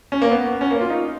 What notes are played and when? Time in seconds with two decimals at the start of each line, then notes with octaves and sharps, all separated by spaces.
0.12 C#4
0.22 A#3
0.31 B3
0.51 B3
0.61 C#4
0.71 A#3
0.81 F4
0.90 D#4